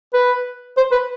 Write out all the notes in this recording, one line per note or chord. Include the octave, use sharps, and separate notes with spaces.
B4
C5
B4